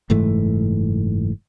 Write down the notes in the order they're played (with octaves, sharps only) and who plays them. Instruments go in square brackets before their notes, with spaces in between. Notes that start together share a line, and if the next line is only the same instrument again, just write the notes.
[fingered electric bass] F#1 G#2 E3 A3